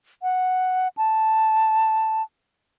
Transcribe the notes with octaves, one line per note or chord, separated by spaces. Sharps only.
F#5
A5